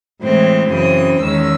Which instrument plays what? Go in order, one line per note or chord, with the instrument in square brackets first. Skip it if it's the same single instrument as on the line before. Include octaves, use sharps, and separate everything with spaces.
[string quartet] A2 E3 G#3 C4
F#2 C#3 E3 C4 D#6
E2 D#3 G#3 C#4 E6